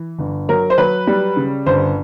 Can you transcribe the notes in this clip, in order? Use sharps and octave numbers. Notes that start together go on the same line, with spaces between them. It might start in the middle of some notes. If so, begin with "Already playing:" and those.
Already playing: E3
G1
F#3 A#4
C5
F#3 B4
G3
C#3
G1 C5